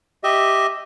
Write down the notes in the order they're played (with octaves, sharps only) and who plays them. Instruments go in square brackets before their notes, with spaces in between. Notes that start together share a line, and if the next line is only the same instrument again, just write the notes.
[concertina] G4 D#5 E5